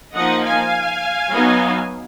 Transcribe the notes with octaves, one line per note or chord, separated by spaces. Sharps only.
F3 A#3 D#4 D#5 F#5
F5 G#5
F#3 B3 D#4